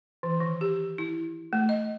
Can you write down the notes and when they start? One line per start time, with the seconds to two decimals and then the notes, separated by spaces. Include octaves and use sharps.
0.23 E3
0.40 D#3
0.61 G4
0.98 E4
1.53 A3
1.69 D#5